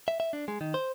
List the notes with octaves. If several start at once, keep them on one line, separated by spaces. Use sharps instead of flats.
E5
E5
D4
G#3
D#3
C5